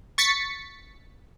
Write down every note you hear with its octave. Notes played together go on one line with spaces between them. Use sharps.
C#6 A6 B6 C#7